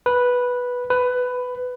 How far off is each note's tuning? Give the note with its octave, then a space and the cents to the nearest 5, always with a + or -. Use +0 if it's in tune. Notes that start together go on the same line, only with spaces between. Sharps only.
B4 -5
B4 +15